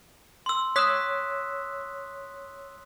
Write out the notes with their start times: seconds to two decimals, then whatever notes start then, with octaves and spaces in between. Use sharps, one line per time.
0.46 C6 E6
0.76 C#5 D#6 E6 F#6 B6